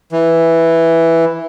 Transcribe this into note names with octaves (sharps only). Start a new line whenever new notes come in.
E3